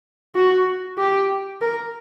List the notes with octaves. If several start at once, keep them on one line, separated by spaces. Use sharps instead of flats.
F#4
G4
A#4